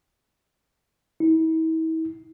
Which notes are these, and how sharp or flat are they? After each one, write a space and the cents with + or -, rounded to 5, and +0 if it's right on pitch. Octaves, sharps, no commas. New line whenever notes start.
E4 -40